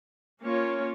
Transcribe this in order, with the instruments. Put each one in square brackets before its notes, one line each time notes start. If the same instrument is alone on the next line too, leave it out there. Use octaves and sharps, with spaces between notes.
[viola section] A#3 C#4 F4 C#5